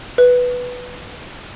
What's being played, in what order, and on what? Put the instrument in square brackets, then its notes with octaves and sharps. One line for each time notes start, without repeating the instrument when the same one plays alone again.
[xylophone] B4